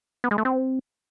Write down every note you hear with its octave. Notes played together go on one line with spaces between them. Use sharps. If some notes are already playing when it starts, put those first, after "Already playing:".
B3
G#3
A3
C4